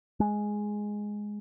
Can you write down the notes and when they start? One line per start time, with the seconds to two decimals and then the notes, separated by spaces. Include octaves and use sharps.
0.20 G#3